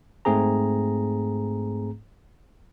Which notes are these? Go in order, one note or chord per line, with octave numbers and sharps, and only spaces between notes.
G#2 A3 C4 G#4 A#5